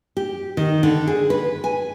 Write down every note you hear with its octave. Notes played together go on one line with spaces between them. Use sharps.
G4
D#3
D3
G#4
B4
G#5